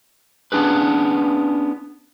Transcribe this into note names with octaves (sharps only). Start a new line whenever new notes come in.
B3 C#4 D4 G#4 B4